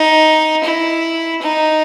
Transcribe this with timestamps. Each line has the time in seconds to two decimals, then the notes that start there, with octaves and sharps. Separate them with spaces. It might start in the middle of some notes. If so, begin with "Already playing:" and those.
Already playing: D#4
0.64 E4
1.42 D#4